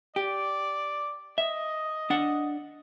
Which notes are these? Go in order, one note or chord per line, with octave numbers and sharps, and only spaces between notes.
G4 D5
D#5 E5
D4 F#5